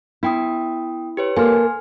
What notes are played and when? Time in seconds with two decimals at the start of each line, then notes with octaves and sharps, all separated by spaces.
0.23 B3 E4 G5 D#6
1.17 G4 B4 C#5
1.37 A#3 A4 G#5 C6 F6